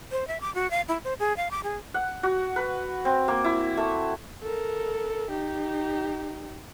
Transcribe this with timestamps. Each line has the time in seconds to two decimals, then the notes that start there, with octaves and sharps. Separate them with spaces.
0.11 C5
0.27 E5
0.41 D6
0.55 F#4
0.71 F5
0.88 E4
1.04 C5
1.19 G#4
1.37 F5
1.51 D6
1.64 G#4
1.94 F#5
2.23 F#4
2.56 B4
3.05 C4
3.28 A#3
3.44 E4
3.77 A3
4.42 A4 A#4
5.31 D#4 G4